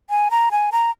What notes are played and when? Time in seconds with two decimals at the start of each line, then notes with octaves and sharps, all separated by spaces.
0.10 G#5
0.31 A#5
0.51 G#5
0.72 A#5